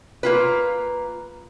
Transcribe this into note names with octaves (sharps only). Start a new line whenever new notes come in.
A#3 F4 B4